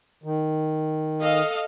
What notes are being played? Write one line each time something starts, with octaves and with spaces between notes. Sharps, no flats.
D#3
A4 D#5 F5